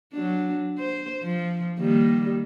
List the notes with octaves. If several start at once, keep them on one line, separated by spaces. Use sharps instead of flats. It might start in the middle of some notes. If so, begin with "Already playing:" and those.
F#3 D4
C5
F3
D#3 G3 A#3